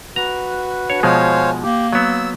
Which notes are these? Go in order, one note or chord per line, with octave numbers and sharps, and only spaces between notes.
F#4 B4 A#5
D4 C#5
B2 F3 G#3 C5 C#5 F5 G#5
A#3 G4
F#3 B3 E6